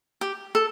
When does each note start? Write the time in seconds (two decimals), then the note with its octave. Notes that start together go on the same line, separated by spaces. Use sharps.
0.21 G4
0.55 A4